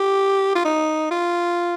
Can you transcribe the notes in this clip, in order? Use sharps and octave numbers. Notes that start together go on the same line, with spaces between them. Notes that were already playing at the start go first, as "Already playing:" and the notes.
Already playing: G4
F4
D#4
F4